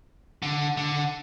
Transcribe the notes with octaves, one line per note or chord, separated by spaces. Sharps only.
D3
D3